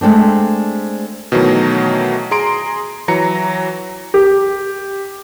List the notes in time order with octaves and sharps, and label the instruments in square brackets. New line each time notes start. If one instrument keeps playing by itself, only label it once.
[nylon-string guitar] G#3 A3 C4 D4
[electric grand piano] B2 D#3 E3 F#3 A3
G#4 A#5 C6 D7
E3 F#3 A#5 C#7
[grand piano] G4